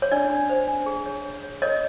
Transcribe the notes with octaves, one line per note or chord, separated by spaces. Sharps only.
C#5
D4 D5
D4
C5
D4
G#4
C#5
C#5
C#5
A#4 C#5 D#5